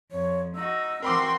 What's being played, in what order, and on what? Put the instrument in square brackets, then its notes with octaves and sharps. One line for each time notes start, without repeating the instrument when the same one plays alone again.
[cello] F2 [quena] C#5
[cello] D#4 F#4 [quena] E6
[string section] E3 G5 C6 [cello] C4 F#4 [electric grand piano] A#4 B5 D6